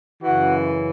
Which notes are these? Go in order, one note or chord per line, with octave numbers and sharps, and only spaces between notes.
F#2 C#3 E3 F#4